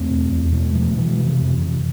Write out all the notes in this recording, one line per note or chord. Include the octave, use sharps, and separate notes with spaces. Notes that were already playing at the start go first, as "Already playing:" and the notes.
Already playing: E2 A3 C4
B2
E2
B2 G#3 B3
B2 F3 A3
B2 E3 G#3
C3 E3
F2
C3